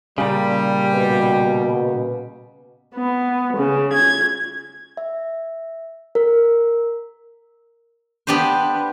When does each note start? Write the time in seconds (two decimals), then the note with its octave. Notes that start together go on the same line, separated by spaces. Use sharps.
0.18 A#2 C#3 G3
0.94 B2 B4
2.95 B3
3.57 C#3
3.92 G#6
4.97 E5
6.15 A#4
8.27 B3 D4 G4 B4 C5